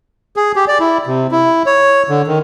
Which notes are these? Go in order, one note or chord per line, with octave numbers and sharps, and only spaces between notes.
G#4
G4
D5
E4
C3
E4
C#5
D3
D#3